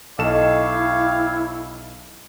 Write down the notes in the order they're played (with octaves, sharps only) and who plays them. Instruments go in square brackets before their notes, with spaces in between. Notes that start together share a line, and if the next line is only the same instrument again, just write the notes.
[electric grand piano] B1 A4 E7 [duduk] E4 [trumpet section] G4 C#5 F5 [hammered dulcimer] D#5